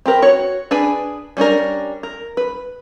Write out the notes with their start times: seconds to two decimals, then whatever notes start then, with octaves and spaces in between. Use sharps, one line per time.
0.06 C4 G4 A#4 B4
0.22 F#4 C#5
0.71 D4 G#4 B4 G#5
1.37 G3 C#4 D4 A#4
2.03 A#4
2.37 B4